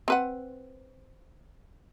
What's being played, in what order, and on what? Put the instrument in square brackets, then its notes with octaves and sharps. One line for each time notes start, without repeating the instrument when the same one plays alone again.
[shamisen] C4 B4 F#5